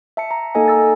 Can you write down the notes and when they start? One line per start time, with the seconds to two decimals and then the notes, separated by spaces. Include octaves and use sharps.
0.17 E5 A5 C#7
0.31 A#5
0.55 A#3 D#4 A4 D#5 G#5
0.68 A#5 E6 A6